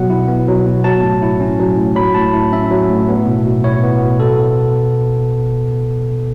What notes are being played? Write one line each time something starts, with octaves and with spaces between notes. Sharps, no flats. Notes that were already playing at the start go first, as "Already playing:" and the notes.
Already playing: B2 F#3 F#5
E4
B3
F#3
B2
F#3 A5
A2
E4
C#4
F#3
A2
F#3 B5
A2 A5
E4
C#4 E5
F#3
A2
B3
B2
B2
E4 C#5
B3
B2
B2 A4